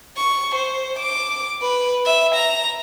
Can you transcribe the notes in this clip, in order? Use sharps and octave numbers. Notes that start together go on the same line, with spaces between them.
C#6
C5
D6
B4
E5
A#5